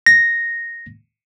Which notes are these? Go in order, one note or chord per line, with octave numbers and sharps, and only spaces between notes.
A#6